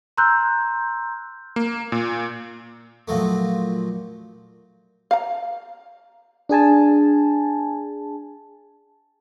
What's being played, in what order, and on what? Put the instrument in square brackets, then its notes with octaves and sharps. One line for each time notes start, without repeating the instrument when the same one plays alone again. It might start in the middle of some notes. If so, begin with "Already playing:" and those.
[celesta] A#5 C6 E6 F#6 G6
[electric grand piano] A#3
A#2
[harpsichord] A#2 F3 F#3 A3
[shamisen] F5 A#5
[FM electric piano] D4 G#4 G#5 A5